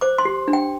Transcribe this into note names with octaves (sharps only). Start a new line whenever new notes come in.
C5 D6
C6
G4
D4
G5